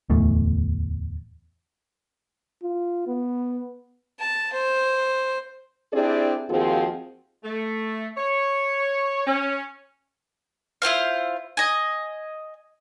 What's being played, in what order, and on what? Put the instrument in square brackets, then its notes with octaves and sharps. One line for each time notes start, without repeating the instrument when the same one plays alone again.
[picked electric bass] D1 E2 A3
[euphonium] F4
B3
[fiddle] A5
C5
[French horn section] C4 D4 E4 G4 G#4 D5
D#2 F3 C4 F4 F#4 G#4
[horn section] A3
C#5
C#4
[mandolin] E4 F4 C5 F5
D#5 G#5